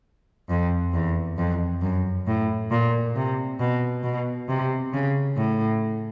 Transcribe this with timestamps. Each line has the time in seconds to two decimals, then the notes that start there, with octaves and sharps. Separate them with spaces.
0.49 F2
0.94 E2
1.38 F2
1.82 F#2
2.27 A2
2.71 A#2
3.16 C3
3.60 B2
4.03 B2
4.48 C3
4.93 C#3
5.37 A2